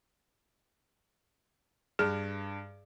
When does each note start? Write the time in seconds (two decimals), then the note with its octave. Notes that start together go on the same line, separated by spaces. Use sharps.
1.99 G2 G#4